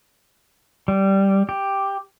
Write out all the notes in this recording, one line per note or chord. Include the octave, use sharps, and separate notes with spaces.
G3
G4